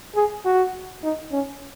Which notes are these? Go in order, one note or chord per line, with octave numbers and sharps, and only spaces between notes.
G#4
F#4
D#4
C#4